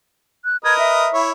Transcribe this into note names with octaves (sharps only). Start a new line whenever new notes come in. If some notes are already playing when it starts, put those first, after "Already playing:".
F#6
A#4 B4 D#5 G#6
E5
E4 C#5